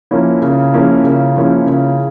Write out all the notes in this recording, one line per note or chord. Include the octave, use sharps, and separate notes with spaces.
F3 A#3 C#4 E4
C#3
F3 A#3 C#4 E4
C#3
F3 A#3 C#4 E4
C#3